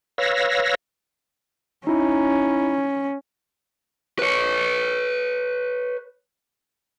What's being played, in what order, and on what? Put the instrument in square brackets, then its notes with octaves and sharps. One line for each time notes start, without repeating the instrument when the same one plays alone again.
[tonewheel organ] B4 C#5 F5 E6 A#6
[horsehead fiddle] C#4 [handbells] D#4 E4
[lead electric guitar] B4 C#5